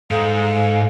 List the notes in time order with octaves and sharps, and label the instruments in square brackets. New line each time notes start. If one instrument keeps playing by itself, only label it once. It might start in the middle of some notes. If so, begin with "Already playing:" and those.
[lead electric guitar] G#2 [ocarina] A4 [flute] F5